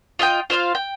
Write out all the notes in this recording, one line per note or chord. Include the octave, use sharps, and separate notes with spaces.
F4 D#5 E5 G5
F4 C5 E5 F5
G5